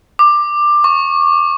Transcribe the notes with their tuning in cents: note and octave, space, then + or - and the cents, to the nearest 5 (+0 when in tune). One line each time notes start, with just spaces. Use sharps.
D6 +15
C#6 -10